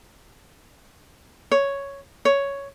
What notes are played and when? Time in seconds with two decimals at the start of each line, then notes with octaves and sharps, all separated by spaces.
1.52 C#5
2.25 C#5